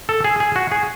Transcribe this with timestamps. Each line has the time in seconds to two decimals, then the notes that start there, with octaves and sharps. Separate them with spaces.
0.09 A4
0.24 G#4
0.40 G#4
0.56 F#4
0.71 G#4